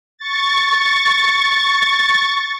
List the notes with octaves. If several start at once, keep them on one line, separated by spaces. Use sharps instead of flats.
C#6 A6